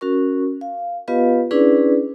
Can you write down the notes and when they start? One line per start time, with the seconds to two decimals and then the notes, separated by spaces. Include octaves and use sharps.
0.01 C#4 F#4 A#4 C#6
0.61 F5
1.08 B3 F4 G4 B4 D#5 F5
1.51 C#4 D4 E4 G#4 B4 D5